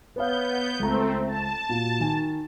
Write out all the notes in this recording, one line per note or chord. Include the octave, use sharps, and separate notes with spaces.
B3 B4 C#5 F5 G6
C#2 A3 C4 A#5
A5
A#2 F#4
D#3 G#5